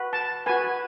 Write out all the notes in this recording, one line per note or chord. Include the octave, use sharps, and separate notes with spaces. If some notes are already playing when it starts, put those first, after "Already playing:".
Already playing: F#4 B4
A5
F#4 B4 G#5